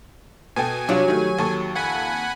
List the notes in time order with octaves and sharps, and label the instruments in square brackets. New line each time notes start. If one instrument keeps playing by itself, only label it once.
[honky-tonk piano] B2 A4 G5 [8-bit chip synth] G#5
[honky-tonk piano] C3 D4 F4 [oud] F#3 G4
[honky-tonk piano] D#3 A3
D#2 A4 C#6
[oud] F2 [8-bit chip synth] F#5 G#5 B5